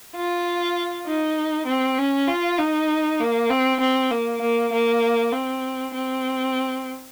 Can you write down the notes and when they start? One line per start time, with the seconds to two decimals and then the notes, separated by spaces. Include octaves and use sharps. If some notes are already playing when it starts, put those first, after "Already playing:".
0.15 F4
1.06 D#4
1.67 C4
1.98 C#4
2.28 F4
2.59 D#4
3.20 A#3
3.50 C4
3.80 C4
4.11 A#3
4.42 A#3
4.72 A#3
5.32 C4
5.94 C4